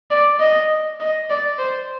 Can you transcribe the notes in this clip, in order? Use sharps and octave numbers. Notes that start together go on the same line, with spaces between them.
D5
D#5
D#5
D5
C5